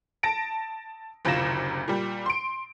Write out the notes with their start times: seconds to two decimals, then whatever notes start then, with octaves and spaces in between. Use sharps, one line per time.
0.23 A5 A#6 D7
1.25 F#1 D2 C3 F4 A#6 E7
1.88 A#2 G3
2.26 C6 D7